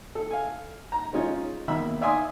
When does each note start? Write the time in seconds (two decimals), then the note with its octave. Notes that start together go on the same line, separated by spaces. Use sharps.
0.15 A4
0.31 F5 G#5
0.92 A#5
1.13 G#3 C#4 D#4 F4 C#5
1.68 B2 D#3 A#3 E5 B5
2.01 D5 E5 F5 G#5 C6 D#6